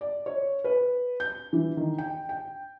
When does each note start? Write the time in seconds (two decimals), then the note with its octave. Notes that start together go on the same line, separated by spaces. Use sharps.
0.01 D5
0.26 C#5
0.64 B4
1.20 G6
1.53 E3
1.77 D#3
1.98 G5
2.29 G5